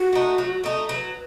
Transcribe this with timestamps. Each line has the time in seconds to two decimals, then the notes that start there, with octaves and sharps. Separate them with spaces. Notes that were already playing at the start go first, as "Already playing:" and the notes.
Already playing: F#4
0.13 A3 D#4
0.38 F#3
0.64 A3 D#4
0.89 F#3 B4